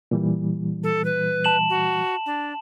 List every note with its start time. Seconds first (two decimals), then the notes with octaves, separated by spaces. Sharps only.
0.11 A#2 E3 G3
0.83 A4
1.05 B4
1.44 A5 E7 F#7
1.70 F#4
2.26 D4